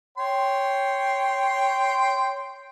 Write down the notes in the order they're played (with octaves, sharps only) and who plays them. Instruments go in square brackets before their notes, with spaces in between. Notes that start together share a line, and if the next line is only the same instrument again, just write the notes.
[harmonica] C#5 G5 C6